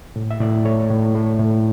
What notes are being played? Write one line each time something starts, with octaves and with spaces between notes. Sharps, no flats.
A2
E5
A2 D5
A3 C#5
A2
A3
A2